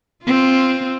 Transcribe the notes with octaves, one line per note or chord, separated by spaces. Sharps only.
C4 F4